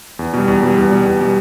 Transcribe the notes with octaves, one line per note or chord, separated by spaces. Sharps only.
E2
B2 G3
E2
B2 G3
E2
B2 G3
E2
B2 G3